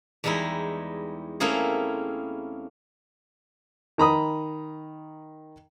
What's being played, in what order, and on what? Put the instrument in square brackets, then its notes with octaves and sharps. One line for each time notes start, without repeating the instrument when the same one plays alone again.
[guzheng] E2 G3 G#3 D#4 E4
A3 A#3 C4 C#4 E4 G#4
[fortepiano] D#3 A#5 B5 D#6